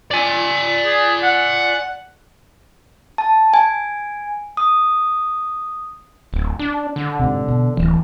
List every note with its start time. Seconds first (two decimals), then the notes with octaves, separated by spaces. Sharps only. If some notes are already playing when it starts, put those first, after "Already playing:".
0.11 D5 G#5
0.86 G#4
1.23 F#5
3.18 A5
3.54 G#5
4.57 D#6
6.33 D1
6.59 D4
6.96 D3
7.19 G#2 C3
7.48 B2
7.77 D1 E3